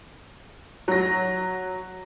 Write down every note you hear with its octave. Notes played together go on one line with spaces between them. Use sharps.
F#3 A#6